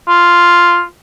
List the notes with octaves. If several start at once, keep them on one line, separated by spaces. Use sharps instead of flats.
F4